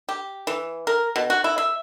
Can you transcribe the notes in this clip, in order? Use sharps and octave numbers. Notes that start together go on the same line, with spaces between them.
G4
E3
A#4
B2
F#4
E4
E5